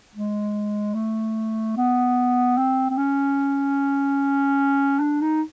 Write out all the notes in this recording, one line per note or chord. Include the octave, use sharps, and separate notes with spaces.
G#3
A3
B3
C4
C4
C#4
D4
D#4